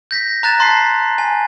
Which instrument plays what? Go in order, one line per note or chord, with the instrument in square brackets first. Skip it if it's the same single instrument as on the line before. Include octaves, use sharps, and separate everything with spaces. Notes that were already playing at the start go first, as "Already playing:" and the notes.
[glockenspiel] G6 A#6 B6
A#5 F#6 A6 E7
A5 C6 B6 C7
G#5